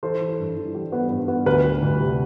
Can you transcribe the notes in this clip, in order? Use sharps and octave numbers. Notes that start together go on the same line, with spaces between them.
E3 A4 C5
E3
G2
E3
G3
B3
G2
B3
D2 B4
G3
D2
C3